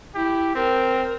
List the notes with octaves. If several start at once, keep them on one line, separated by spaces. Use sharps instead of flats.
E4 G4
C4 A#4